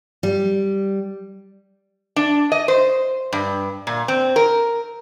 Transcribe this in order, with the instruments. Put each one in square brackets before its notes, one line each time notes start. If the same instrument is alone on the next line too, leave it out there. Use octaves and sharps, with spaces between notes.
[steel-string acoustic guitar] G3
[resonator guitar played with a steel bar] D4
D#5
C5
G2
A#2
C4
A#4